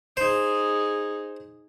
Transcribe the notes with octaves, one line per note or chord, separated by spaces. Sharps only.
D#4 G#4 C5